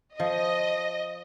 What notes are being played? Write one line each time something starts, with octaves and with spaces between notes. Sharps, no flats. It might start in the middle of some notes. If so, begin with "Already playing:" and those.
F3 D#5